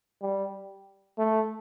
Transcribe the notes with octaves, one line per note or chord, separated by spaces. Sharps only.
G3
A3